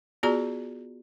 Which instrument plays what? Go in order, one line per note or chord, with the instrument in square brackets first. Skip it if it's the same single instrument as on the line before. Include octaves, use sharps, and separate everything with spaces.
[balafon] B3 F4 F#4 G#4 D5 A#5